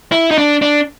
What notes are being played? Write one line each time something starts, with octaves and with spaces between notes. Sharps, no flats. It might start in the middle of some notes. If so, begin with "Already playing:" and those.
E4
D#4
D4
D4